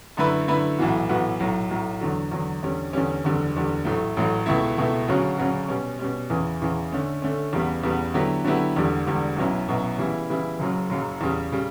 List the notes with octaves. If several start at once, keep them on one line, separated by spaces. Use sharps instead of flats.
F#2 D3 A3 E4 B4
F#2 D3 A3 E4 B4
B1 A2 E3 B3 F#4
B1 A2 E3 B3 F#4
B1 A2 F#3
B1 A2 F#3
E2 D3 F#3
E2 D3 F#3
E2 D3 G3 C#4
E2 D3 G3 C#4
F#1 E2 D3 G3
F#1 E2 D3 G3
A1 A2 F#3 A3
A1 A2 F#3 A3
C#2 B2 A3 E4
C#2 B2 A3 E4
D2 C#3 F#3 C#4 F#4
D2 C#3 F#3 C#4 F#4
B2 G3 C#4
B2 G3 C#4
E2 C#3 E3
E2 C#3 E3
D3 A3 C#4
D3 A3 C#4
E2 C#3 G3 B3
E2 C#3 G3 B3
D3 F#3 B3 E4 G4
D3 F#3 B3 E4 G4
E1 E2 D3 G3
E1 E2 D3 G3
B1 B2 F#3 C#4 E4
B1 B2 F#3 C#4 E4
C#3 E3 G3 B3 E4
C#3 E3 G3 B3 E4
F#1 F#2 C#3 F#3
F#1 F#2 C#3 F#3
E2 C#3 G3
C#3 G3